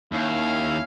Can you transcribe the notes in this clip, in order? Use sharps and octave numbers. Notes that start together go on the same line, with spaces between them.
D#2 C#4 E4 F5